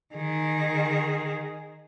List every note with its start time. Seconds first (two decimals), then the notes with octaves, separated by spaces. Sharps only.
0.15 D#3 G#4